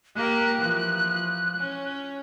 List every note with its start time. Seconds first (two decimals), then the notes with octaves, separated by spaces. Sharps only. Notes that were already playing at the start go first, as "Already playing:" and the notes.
0.16 A#3 G4 A#4 F#6
0.58 E3 F3
1.57 C#4